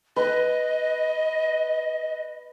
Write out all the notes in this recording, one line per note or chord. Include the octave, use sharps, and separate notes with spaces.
B4 D#5